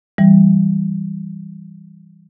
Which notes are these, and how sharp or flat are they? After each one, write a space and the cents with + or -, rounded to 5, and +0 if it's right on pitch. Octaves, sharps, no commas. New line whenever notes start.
E3 +0 G3 +0